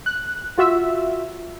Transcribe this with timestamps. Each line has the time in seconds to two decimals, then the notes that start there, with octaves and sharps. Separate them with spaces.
0.06 F#6
0.58 F4 F#4 E5